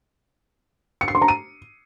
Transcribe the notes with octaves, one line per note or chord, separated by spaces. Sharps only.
C#7
C7
C6
A#5
D#7